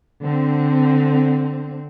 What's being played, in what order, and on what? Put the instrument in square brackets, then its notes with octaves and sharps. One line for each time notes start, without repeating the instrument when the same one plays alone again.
[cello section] D3 C4